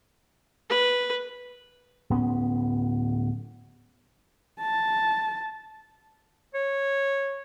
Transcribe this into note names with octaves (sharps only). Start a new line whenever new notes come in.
B4
D1 B3 C#4
A5
C#5